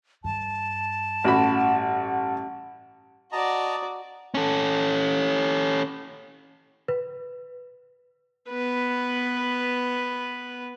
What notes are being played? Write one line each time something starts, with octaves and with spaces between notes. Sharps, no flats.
G2 A5
A1 F#4 F#5 B5
F#4 D5 D#5 A5 A#5
C#4 A4
B4
B3 B4